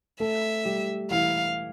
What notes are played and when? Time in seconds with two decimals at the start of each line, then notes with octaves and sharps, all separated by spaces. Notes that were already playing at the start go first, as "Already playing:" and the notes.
0.20 A3 A4 E5
0.65 G3 G4
1.10 E3 E4 F5